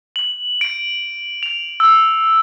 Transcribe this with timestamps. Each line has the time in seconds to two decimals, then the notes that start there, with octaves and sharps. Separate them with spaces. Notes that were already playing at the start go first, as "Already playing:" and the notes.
0.16 F#7
0.61 D7
1.43 F7
1.80 E6